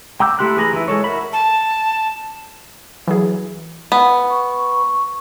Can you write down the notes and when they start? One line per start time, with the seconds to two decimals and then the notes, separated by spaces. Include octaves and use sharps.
0.20 G5 A#5 D6 E6 G6
0.39 A3 E4 G4 C6 F#6
0.57 E3 G#4 A#5 B5
0.73 E3 E4
0.88 G#3 A4 C#5
1.04 F#4 A#4 E5 B5
1.33 A5
3.07 E3 F#3 G#4
3.92 B3
4.29 C#6